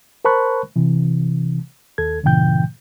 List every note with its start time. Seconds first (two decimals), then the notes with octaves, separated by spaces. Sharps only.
0.25 A#4 C5 A5 B5 C#6 F#6
0.76 C3 E3
1.98 D#2 A4 G#6
2.23 G2 A#2 C#3 E3 G5 G6